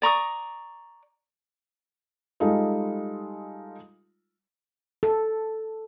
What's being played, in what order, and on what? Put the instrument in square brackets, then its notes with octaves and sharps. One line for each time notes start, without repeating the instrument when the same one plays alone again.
[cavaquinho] D5 A#5 C#6 D#6
[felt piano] G3 G#3 D#4 F4 A4
[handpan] A4